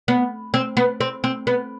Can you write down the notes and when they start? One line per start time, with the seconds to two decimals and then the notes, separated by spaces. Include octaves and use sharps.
0.08 B3
0.54 C4
0.77 B3
1.01 C4
1.24 C4
1.47 B3